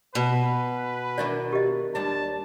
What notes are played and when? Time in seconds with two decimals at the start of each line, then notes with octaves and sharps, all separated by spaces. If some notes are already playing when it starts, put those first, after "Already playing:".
0.15 B2 B4
1.18 D#3 E3 D4 D5
1.53 G4 D#5
1.95 D#2 G3 D4 A5